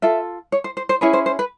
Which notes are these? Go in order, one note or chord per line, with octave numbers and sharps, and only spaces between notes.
F4 A4 E5
C#5
C5
C5
C5
C#4 E4 G#4 B4 C#5
C5
C5
B4